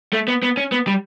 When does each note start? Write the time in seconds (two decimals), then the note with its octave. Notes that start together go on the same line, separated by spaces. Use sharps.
0.13 A3
0.28 B3
0.43 B3
0.57 C#4
0.72 B3
0.87 G3